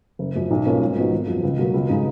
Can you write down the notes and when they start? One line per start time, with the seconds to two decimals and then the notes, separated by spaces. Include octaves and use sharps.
0.19 F#1
0.35 F#2 F3
0.51 B1
0.66 B2 A#3 C#4 F4
0.81 G#2
0.96 F3 B3 D#4 F#4
1.12 G#1
1.28 F#2 F3
1.43 C#2
1.58 B2 F#3 A#3 F4
1.74 C#2
1.89 C#3 G#3 D#4